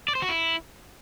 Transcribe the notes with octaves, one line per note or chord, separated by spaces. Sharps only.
D5
C5
F#4
E4